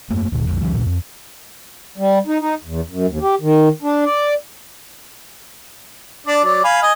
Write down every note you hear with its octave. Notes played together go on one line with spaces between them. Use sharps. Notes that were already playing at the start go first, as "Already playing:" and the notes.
F#2 A3 A#3
D1 D2 A#2
B1 F2
C#2 E3 F#3
C#2 A#2
F2
G3
D#4
D#4
E2
F#2
D#2
G4
D#3
D4
D5
D4 D5
F#3 D5
F5 G#5 B5
D#5 G#5